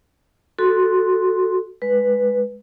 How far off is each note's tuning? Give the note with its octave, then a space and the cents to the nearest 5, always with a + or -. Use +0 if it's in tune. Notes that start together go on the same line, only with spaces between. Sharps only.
F#4 +0 A4 +0 C6 +0
G#3 +0 B4 +0